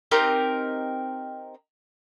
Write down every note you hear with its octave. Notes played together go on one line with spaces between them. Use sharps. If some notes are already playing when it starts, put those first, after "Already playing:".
C4 D#4 G4 A#4